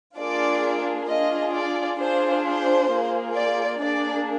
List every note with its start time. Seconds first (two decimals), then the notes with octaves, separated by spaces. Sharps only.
0.17 A#3 D4 F4 G#4 D5
1.08 D4 F4 G#4 D#5
1.53 D5
1.99 D4 F4 G#4 C5
2.44 C5
2.90 A#3 F4 G#4
3.35 D5
3.80 A#3 D4 G#4 D5